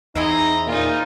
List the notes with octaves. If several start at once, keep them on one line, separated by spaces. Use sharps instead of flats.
E2 C4 D#4 E4 G#4 D#5 A#5
A#2 D#4 F4